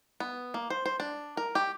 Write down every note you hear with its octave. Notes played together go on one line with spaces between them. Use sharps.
B3
A#3
C5
C5
D4
A#4
G4